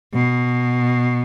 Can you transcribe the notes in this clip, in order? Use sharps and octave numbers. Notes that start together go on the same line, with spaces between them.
B2